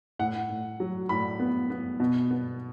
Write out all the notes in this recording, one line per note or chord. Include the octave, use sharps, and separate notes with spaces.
A2 F#5
A2
F#3
A2 B5
B3
B3
B2
B3